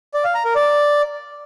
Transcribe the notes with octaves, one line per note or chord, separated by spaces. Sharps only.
D5
F5
A#5
A#4
D5